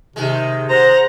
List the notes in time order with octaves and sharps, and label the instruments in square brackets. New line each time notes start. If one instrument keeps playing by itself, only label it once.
[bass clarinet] C3 [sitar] D#3 G#3
[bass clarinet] C5 [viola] F#5 A#5